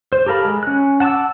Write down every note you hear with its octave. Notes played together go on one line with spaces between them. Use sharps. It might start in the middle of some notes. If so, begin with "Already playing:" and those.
C5
G4 A4 A#4 F5 B5
G#3
C#4 F#6
F#5 A5 C#6 D6 E6